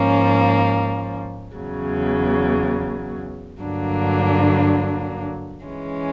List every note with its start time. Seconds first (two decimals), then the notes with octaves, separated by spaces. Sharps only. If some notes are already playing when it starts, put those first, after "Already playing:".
Already playing: G#2 F3 A#3 C#4
1.57 E2 C#3 F#3
3.60 G2 D3 F#3 A#3 D4
5.65 E3 G#3 C#4